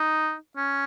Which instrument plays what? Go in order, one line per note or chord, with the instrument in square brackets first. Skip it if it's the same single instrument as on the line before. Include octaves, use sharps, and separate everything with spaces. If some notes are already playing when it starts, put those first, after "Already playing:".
Already playing: [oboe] D#4
C#4